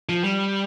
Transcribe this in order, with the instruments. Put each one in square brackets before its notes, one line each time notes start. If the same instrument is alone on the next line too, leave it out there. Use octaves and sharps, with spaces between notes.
[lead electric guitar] F3
G3